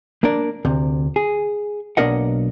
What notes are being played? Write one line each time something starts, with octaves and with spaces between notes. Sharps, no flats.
A#3 D4 A#4 D5
D2 C3
G#4
B1 A#3 D4 A#4 D#5 F#5